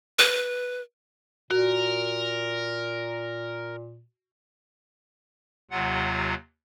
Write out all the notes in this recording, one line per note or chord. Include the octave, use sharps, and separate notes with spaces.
B4
A#2 F#4 A#4
D#2 C3 F#3 F4 F#5